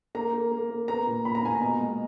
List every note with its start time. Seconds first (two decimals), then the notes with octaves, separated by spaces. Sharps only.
0.15 A#3 A#5
0.33 A#3
0.51 A#3
0.70 A#3
0.88 B3 A#5
1.07 A#2
1.25 A#2 B5
1.35 A#5
1.43 A#2 G#5
1.55 A#5
1.61 B2
1.80 G#3